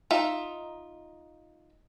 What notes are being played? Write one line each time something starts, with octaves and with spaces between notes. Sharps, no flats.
D#4 F4 E5